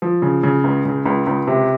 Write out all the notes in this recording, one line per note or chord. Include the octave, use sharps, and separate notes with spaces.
F3
C#3
C#3
C#2
C#3
C#2
C#2
C3